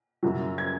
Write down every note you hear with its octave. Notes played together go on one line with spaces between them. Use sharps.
F#2 C#3 F#3
G#6